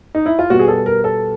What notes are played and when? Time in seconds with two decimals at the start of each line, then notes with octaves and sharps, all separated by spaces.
0.15 D#4
0.26 E4
0.39 F4
0.50 B2 G3 B3 F#4
0.59 G#4
0.68 A4
0.86 A#4
1.04 A4